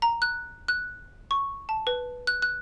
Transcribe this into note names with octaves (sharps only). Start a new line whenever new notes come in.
A#5
F#6
F#6
C#6
A5
B4
F#6
F#6